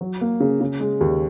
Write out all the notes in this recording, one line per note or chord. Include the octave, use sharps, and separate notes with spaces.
F#3
A#3
C#3
C#3
G#3
D#2